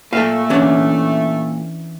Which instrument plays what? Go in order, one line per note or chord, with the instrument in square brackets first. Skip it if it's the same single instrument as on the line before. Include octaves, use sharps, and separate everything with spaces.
[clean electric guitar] A#2 [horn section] A3 [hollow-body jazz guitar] A4 E5 F5
[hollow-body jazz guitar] E3 C#4 D4